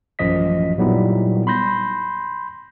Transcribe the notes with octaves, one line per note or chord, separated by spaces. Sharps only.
A1 F#2 F3 D#5 B6
A#2 F#3 G3 B3 D#4 E4
B5 C6 G6 A#6